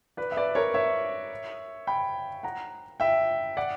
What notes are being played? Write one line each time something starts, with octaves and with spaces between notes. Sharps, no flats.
B4 D5
E5
B4 D5
A#4 C#5
C#5 E5
G5 B5
F#5 A#5
E5 G5
D5 F#5